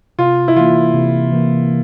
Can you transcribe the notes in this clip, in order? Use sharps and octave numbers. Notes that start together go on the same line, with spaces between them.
C3 F4
E4
E3 A#3 F4
C3
E3 A#3